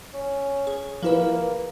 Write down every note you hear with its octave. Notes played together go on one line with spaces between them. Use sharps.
C#4
G#4
F3 A#3 E4 B4